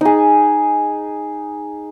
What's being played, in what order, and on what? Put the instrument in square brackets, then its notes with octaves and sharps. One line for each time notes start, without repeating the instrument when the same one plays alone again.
[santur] D#4 G#4